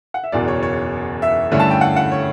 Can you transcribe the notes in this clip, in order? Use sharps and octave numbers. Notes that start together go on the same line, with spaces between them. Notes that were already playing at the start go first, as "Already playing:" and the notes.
F#5
E5
F#1 E2 B2 D5
C#5
C#5
E5
G2 D3 A3 C#4 E4
A5
G5
F#5
F#5
C#5